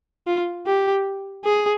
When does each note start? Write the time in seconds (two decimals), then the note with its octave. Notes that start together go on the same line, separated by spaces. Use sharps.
0.27 F4
0.67 G4
1.45 G#4